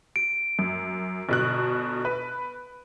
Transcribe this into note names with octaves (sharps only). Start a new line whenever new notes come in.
D7
F#2
G1 B2 F#6
B4